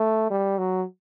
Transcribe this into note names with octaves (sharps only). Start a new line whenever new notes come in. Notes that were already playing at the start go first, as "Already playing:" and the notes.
Already playing: A3
G3
F#3